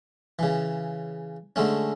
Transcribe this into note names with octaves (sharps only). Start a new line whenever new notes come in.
C#3 E3
D3 G#3 A3 C#4